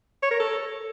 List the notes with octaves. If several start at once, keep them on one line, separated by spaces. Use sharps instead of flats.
C#5
A#4
A4